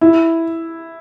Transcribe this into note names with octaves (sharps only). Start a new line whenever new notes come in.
E4